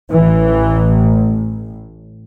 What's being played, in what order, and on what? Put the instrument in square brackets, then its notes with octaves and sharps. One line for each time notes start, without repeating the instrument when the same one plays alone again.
[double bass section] A1 A2 E3